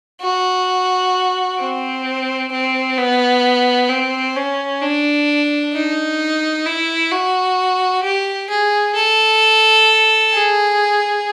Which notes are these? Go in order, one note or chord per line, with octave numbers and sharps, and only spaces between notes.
F#4
C4
C4
B3
C4
C#4
D4
D#4
E4
F#4
G4
G#4
A4
G#4